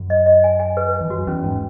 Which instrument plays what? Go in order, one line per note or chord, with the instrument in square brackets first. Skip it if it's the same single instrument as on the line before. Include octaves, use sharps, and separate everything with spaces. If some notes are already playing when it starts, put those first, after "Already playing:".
Already playing: [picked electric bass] F#2
[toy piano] D#5
D#5
G#5
G#5
B4
G#5
[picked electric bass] E2
[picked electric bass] F#2 [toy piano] F#4
[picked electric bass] E2 [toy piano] C#4
[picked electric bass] G#2 [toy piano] C#4